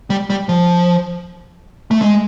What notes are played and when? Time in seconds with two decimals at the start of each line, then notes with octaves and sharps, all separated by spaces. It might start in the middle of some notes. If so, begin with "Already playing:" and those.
0.10 G3
0.30 G3
0.49 F3
1.91 A3
2.02 G#3